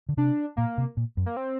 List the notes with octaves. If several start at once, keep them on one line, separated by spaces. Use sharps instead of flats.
D3
C3 D4
A#2 A#3
C3
A#2
F#2
A#3
C4